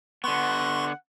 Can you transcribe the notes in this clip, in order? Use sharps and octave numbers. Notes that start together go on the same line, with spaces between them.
D3 B3 F#5 C6 C#6